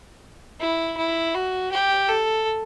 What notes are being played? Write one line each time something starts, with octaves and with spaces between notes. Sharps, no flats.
E4
E4
F#4
G4
A4